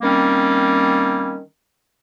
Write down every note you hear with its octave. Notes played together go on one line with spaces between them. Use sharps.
D#3 G3 A#3 C4 C#4